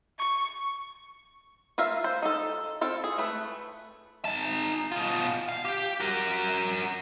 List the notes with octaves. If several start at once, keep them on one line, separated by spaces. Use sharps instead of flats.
C#6
F4 A#4 E5 F5
C5
D#4 A4
C4 F4 A4
G#4
A3 B4
D#4 A5
B2 F4
F5
G4
F#4 A#4